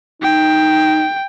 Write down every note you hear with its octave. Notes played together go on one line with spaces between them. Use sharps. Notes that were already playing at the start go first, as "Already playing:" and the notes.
D#4 G5